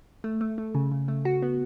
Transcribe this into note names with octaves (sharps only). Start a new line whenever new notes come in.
A3
A3
A3
C#3
C#3
A3
F#4
B3